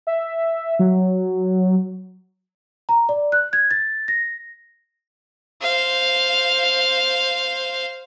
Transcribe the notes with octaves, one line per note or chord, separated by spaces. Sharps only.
E5
F#3
A#5
D5
F#6
G#6
A6
A#6
C5 F5